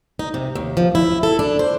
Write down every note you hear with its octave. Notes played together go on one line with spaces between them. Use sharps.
D#4
C3
D#2
F3
E4
A4
D4
C5